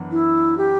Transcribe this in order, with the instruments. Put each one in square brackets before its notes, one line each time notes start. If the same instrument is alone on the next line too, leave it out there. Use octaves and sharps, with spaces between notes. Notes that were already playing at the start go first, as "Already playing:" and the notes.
Already playing: [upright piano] F#2 E3 B3 D4
[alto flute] E4
G4